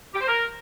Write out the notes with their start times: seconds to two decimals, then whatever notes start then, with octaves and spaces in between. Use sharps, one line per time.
0.14 G4
0.21 C5
0.28 A#4